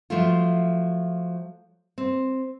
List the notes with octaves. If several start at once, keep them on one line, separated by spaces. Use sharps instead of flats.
F3 F#3 A3 F4
C4